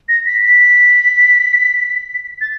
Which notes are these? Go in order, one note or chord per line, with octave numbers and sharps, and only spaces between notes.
A#6
B6
B6
A6